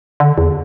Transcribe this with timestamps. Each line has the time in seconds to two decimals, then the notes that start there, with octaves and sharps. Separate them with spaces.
0.20 D3
0.38 E2